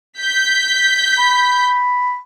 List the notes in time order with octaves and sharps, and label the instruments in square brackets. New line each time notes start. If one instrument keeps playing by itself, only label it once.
[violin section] G6 B6
[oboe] B5